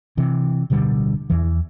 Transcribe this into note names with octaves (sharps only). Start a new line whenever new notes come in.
C3 E3
D1 B2 D3 G3
E2 E3